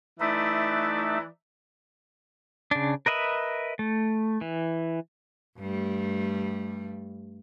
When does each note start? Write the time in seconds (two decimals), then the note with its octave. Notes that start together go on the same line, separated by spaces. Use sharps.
0.20 E3 A3 D#4 B4 D5 E5
2.71 C#3 D4
3.06 A#4 B4 D#5 E5 B5
3.79 A3
4.41 E3
5.59 G2 G3 A3